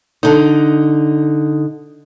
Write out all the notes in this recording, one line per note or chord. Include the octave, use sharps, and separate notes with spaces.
D3 D#4